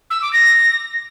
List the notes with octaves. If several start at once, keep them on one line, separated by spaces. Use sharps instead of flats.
E6
D6
A#6